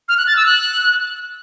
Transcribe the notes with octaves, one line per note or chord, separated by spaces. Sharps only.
F6
F#6
A6
E6
F#6